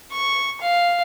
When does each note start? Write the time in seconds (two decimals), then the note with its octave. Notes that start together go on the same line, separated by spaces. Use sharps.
0.13 C#6
0.61 F5